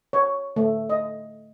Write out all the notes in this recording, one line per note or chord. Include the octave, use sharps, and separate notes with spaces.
C#5
A3
D#5